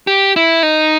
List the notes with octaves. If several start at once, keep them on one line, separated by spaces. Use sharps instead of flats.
G4
E4
D#4